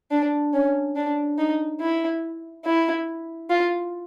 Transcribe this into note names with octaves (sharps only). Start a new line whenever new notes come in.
D4
C#4
D4
D#4
E4
E4
F4